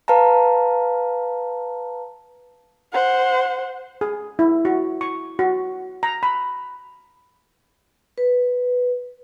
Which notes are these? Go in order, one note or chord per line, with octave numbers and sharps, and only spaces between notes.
B4 F5 A5 A#5
C5 F#5
G#4
E4
F#4
C#6
F#4
A#5
B5
B4